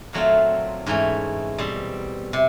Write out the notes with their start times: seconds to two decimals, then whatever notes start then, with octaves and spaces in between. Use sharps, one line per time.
0.13 A#2 F#3 A3 C4 F4
0.86 G#2 E3 A3 C#4
1.58 B2 G3 C4
2.33 C3